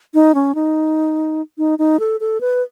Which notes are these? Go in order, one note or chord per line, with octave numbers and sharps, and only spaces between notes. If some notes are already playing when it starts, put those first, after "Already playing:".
D#4
C#4
D#4
D#4
D#4
A4
A4
B4